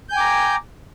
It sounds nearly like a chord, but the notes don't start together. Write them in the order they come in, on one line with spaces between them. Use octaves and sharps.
G6 G#5 G5 D6 A#5